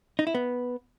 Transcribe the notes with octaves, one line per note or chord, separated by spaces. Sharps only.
D#4
E4
B3